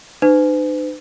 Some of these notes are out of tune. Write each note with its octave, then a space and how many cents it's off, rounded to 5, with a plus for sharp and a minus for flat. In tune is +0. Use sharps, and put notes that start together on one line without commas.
D#4 -45 B4 +45